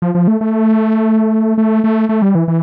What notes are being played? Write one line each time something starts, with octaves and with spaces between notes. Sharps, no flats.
F3
F3
A3
A3
A3
A3
A3
G3
E3
E3